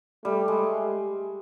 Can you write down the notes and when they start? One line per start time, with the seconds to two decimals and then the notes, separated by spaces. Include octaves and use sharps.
0.25 G3 A3
0.48 G#3